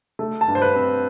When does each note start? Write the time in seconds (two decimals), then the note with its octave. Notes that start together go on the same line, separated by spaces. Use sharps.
0.19 A3
0.41 A5
0.48 G2
0.55 C5
0.62 B4
0.76 C4